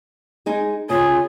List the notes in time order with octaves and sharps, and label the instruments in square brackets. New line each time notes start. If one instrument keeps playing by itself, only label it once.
[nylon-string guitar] G#3 D#4 G#4
[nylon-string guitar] C#3 C#4 [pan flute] F4 [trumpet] G#4